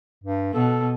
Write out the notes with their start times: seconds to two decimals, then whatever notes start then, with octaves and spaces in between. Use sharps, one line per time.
0.24 G2
0.54 B2 A4